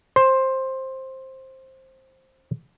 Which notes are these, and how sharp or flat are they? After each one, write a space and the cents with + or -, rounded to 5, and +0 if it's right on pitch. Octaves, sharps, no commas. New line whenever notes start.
C5 +10